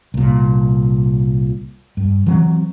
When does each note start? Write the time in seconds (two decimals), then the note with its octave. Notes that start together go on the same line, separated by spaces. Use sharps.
0.14 C2 A#2
1.97 G2
2.27 E3 F#3 C4